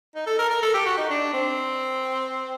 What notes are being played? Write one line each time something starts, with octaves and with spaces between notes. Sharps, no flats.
D#4
A4
A#4
A#4
A4
G4
F#4
D#4
D4
C4